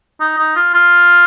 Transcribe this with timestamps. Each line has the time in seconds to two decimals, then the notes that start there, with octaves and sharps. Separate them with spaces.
0.20 D#4
0.38 D#4
0.56 F4
0.74 F4